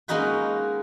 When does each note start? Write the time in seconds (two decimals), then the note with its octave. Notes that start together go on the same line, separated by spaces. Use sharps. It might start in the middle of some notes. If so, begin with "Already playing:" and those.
0.08 G#3 A#3 C#4 D#4 F#4 B4